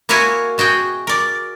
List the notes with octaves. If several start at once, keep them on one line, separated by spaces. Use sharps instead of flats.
A#3 E4 F#4 A#4 C#5 G#5
B2 F#4 G#4 G5
A#4 D5